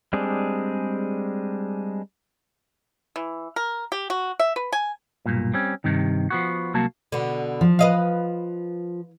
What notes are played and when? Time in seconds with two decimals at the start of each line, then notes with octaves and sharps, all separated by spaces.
0.13 G3 G#3 C4 D4 G#4
3.16 E3
3.56 A#4
3.92 G4
4.10 F#4
4.40 E5
4.56 B4
4.72 G#5
5.26 B1 G2 A#2
5.54 G3 C4 C#4
5.84 G2 C3 D#3
6.30 F3 B3 F#4
6.74 C2 F#3 A#3 F#4 A5
7.12 B2 D3
7.61 F3
7.79 B4 D#5 F5